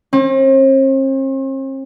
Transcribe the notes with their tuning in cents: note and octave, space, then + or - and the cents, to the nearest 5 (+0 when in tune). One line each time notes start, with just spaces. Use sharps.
C4 +45